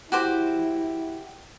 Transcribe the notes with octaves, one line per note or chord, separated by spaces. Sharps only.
E4 F#4 G4 C5